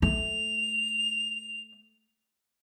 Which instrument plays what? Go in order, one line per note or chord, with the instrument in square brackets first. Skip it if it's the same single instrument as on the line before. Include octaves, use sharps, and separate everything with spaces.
[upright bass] A3 [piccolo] F7